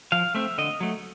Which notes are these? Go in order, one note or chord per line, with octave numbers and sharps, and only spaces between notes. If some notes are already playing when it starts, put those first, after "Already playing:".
F3 F5
A3 C4 E5
D3 D#5
F#3 A3